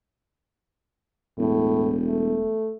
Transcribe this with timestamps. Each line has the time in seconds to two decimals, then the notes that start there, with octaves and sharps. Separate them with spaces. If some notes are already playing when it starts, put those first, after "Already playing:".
1.38 E1 A2
2.07 A3